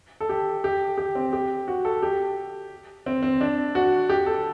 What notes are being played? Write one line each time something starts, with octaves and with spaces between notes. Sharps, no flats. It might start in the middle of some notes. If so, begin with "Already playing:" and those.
A4
G4
G4
G4
C4
G4
F#4
A4
G4
C4
C4
D4
F#4
G4
A4